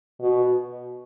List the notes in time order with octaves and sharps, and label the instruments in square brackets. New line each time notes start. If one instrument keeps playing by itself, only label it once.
[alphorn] B2